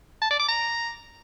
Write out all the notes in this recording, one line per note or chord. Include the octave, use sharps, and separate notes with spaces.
A5
D5
D6
A#5